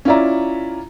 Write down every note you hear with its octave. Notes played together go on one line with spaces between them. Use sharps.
C#4 E4 F4 D5 E5 A#5